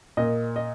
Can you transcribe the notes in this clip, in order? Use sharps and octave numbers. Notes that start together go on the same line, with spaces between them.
A#2 D#5
D#5